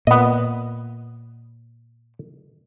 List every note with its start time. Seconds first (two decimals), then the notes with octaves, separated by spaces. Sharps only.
0.07 A#2 B3 D#5